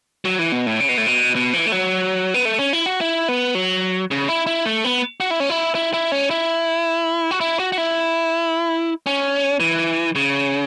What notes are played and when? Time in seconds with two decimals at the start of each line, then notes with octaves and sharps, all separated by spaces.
0.25 F#3
0.39 E3
0.52 B2
0.67 A2
0.80 C#3
0.89 B2
0.98 A2
1.06 B2
1.35 B2
1.54 E3
1.66 A3
1.72 F#3
2.34 B3
2.45 A3
2.58 C#4
2.73 E4
2.86 F#4
3.01 E4
3.28 B3
3.55 F#3
4.11 C#3
4.28 E4
4.47 E4
4.66 A3
4.84 B3
5.20 F#4
5.30 E4
5.40 C#4
5.50 E4
5.75 E4
5.93 E4
6.12 C#4
6.30 E4
7.31 F#4
7.41 E4
7.59 F#4
7.72 F#4
7.78 E4
9.06 C#4
9.60 E3
10.15 C#3